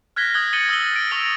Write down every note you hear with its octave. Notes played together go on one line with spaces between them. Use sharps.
F6 F#6 G#6 A#6 B6 G7
D#6 F#6 G#6 G7
A6 A#6 C#7 D#7 F#7 G7
D#6 E6 G#6 F#7 G7
F#6 D7
C#6 D#6 E6 A#6 F7